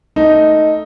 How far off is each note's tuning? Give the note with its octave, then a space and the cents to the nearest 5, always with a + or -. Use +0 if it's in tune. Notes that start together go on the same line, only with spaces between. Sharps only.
A3 +0 D#4 +0